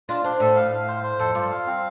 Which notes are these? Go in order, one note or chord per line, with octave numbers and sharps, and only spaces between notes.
D4 F4
C4 D4
A2 A4
F5
F5
C5
C5
F2 A4
G2 F4
F5
C4